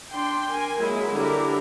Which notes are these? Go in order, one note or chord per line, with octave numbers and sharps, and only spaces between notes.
D4 G5 C6
A#4 G#5
F#3 G#3 A#3 E4
D3 G3 D4 E4 G4 A#4